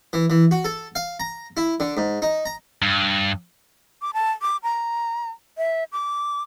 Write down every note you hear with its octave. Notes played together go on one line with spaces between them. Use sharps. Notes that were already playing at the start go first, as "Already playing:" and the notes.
E3
E3
F#4
A4
F5
A#5
E4
D3
G#2
D#4
A#5
G2
D6
A5
D6
A#5
E5
D6